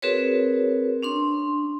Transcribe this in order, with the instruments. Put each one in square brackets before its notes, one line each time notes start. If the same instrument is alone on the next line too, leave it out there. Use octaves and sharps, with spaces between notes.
[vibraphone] C4 F#4 G#4 A#4 B4 C#5
C#4 D4 C6